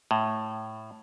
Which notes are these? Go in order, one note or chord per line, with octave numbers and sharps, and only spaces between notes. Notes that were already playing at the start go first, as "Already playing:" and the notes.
A2